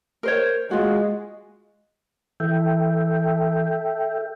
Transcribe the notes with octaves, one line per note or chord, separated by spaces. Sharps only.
A#4 C5 C#5
G#3 F4 F#4
E3 A4 E5 G5